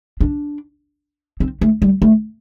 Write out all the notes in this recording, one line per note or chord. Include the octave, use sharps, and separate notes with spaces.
D4
C4
A3
G3
A3